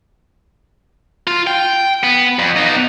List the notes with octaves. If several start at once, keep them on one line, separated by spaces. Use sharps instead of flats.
F4
G5
B3
F2
B3 D#4